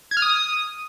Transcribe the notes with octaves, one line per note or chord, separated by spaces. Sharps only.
G#6
F6
D#6